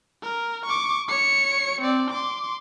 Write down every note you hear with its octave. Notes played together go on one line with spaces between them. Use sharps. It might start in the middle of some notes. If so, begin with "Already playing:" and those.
A#4
C#6 D6
C#5 C#7
C4 D5
C6 D6